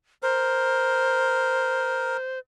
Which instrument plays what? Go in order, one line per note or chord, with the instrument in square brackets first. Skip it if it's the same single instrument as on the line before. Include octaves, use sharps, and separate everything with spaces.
[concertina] A#4 [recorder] C5